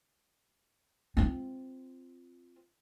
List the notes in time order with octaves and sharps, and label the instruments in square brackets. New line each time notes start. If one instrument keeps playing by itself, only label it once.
[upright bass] C4 F4